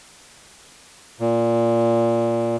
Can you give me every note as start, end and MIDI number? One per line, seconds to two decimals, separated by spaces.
1.20 2.56 46